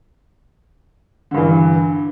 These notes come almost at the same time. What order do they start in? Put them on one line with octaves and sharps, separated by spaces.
D3 G2 E3